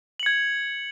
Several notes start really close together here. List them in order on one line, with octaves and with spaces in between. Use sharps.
F#7 C#7 G#6